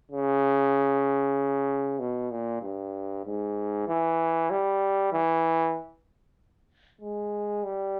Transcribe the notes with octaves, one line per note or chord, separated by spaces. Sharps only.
C#3
B2
A#2
G2
G#2
E3
G3
E3
G#3
G3